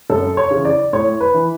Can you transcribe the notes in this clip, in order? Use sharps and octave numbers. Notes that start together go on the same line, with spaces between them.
F#2 A4
C#5
C#3 E3
D5
A2 C#5
B4
E3